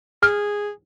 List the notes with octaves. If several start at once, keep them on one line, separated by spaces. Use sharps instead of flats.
G#4 F6